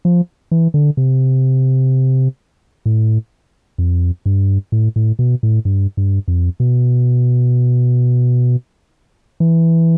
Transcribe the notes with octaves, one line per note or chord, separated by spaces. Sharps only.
F3
E3
D3
C3
A2
F2
G2
A2
A2
B2
A2
G2
G2
F2
B2
E3